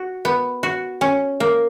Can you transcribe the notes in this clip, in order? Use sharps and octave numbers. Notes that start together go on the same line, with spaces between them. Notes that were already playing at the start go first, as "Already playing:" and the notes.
Already playing: F#4
B3
F#4
C#4
A#3